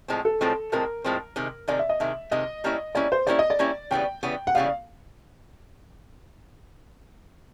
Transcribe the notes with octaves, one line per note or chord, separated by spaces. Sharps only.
A2 F3 G#3 C4
A4
A2 F3 G#3 C4
A2 F3 G#3 C4 A#4
A2 F3 G#3 C4
C3 D#3 G#3
C3 D#3 G#3 D5
E5
D#5
C3 D#3 G#3 E5
C3 D#3 G#3 D#5
G3 A#3 C#4 E4
G3 A#3 C#4 E4 D5
C5
G3 A#3 C#4 E4 D5
D#5
D5
G3 A#3 C#4 E4
C#3 E3 G3 B3 G5
C#3 E3 G3 B3
F#5
C#3 E3 G3 B3 F5